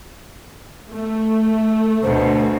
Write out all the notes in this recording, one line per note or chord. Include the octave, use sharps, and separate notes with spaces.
A3
D2 B2 C5